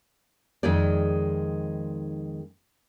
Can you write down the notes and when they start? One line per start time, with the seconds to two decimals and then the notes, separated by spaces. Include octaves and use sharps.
0.63 F2 D#3 G#3 D#4 G#4 D5